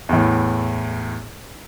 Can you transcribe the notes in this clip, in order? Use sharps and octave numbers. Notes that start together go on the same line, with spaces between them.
E2 A2